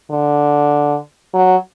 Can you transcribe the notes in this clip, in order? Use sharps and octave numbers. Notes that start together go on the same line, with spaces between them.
D3
F#3